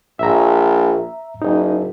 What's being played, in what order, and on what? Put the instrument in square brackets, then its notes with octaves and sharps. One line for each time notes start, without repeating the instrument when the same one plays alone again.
[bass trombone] A#1 [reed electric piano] E5 A#5
[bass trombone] F#1 [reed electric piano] D#4